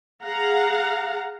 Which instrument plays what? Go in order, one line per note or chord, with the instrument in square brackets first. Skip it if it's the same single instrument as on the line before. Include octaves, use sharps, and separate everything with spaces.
[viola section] G#4 F5 F#5 A#5